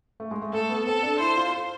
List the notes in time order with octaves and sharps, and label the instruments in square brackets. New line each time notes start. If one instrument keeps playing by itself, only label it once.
[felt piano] A3
G#3
A3
[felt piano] A3 [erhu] A4
[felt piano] B3
[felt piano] C4 [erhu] A4
[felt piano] D4
[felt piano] E4 [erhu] C5
[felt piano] F4
F4